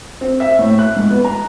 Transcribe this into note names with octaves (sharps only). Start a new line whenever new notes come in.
C4
E5
A2
F#6
G#2
B3
A#5